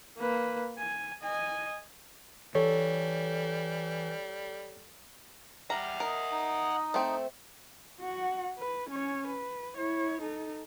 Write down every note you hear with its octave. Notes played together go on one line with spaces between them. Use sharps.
A#3 B4
G#5
D#5 G#5
E3 G3 A4 C#5
G3 E5 F#5 A#5
A#4 D#5
D#4
A3 C4
F#4 F#5
B4
C#4 C#5
B4
E4 C#5
D#4 A4